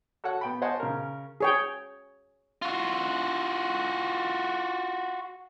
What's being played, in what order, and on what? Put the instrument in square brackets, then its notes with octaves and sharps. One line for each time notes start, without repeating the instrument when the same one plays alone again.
[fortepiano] F#4 A4 C#5 F#5
B3 G5 B5
C5 C#5 D#5 F#5 G#5 A5
C#3 A#4
[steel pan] G#4 C#5 G5
[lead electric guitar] F4 F#4